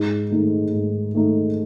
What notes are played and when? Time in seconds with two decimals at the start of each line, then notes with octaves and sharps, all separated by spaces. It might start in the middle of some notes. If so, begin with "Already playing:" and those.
Already playing: G#2
0.31 D#3 A3 D#4
0.72 G#2
1.14 D#3 A3 D#4